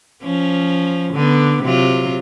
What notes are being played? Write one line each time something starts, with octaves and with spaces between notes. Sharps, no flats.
F3 C#4
D3 B3
C3 F#3 F4